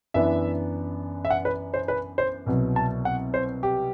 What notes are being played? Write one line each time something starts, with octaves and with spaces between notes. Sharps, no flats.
F#2 E3 B3 D4 E5
E5
F#5
B4
C5
B4
C5
C2 B2 F#3
A5
F#5
C5
G4